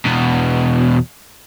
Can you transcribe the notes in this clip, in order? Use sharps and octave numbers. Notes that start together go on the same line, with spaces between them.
E2 B2